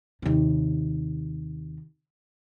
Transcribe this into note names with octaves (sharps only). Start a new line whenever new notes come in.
D#2 C3